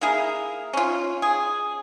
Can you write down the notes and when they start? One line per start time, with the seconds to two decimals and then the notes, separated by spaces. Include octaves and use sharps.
0.01 A#3 E4 G#4 A#4
0.73 C#4 F4
1.22 G#4